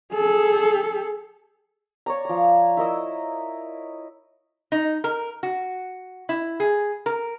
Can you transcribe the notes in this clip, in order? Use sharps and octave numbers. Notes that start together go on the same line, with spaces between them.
G#4 A4
C#5 D5 A#5
F3 A#5
E4 A#4 D#5 E6
D#4
A#4
F#4
E4
G#4
A#4